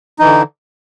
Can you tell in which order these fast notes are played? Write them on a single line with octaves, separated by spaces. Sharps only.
D#4 E3 D3